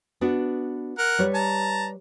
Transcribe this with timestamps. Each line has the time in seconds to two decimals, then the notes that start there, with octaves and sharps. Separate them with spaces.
0.21 B3 D4 F#4
0.98 A#4 F#5
1.19 G3 B4 C#5
1.34 A5 A#5